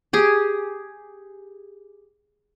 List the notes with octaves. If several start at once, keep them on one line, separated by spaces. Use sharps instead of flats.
G4 G#4